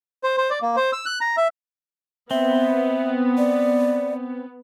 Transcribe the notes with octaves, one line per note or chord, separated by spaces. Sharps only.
C5
C5
D5
A#3
C5
E6
F#6
A#5
E5
B3 C4 E5
D5